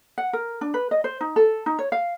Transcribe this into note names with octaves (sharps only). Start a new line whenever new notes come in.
F#5
A#4
D4
B4
D#5
C5
D#4
A4
D#4
C#5
F5